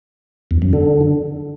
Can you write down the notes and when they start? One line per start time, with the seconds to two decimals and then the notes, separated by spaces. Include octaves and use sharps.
0.51 E2
0.62 F#2
0.73 D3